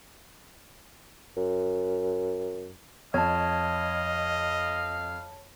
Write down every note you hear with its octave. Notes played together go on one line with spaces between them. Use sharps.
F#2
F2 C#5 D#5 F5 A5